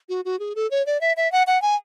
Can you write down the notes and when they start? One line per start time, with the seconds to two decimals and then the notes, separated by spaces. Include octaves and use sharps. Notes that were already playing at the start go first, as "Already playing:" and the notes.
0.09 F#4
0.25 F#4
0.39 G#4
0.55 A4
0.71 C#5
0.86 D5
1.01 E5
1.17 E5
1.32 F#5
1.47 F#5
1.62 G#5